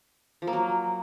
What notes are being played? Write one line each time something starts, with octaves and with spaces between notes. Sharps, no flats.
F3
A#3
F#3